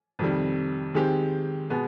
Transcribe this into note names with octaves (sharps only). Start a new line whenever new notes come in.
F2 C3 D#3 G3
D#3 G#3 C4 G4
B2 G#3 B3